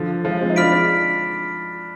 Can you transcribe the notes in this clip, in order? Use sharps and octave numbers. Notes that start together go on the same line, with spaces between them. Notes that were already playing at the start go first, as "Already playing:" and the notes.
Already playing: D3 F3
F3 G#3
G#3 C4
D#4
D4 F4 B5 F6 B6 D7